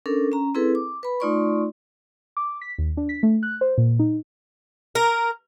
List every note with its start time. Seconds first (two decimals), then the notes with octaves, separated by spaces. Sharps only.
0.06 C#4 D4 A4 A#4
0.32 C#4 A#5
0.55 C4 E4 G#4 A4 B4
0.75 D6
1.03 B4 B5
1.20 A3 D#4 F4 D5 C6 C#6
2.37 D6
2.61 B6
2.78 D#2
2.97 D4
3.09 B6
3.23 A3
3.43 F#6
3.61 C5
3.78 A#2
3.99 D#4
4.95 A#4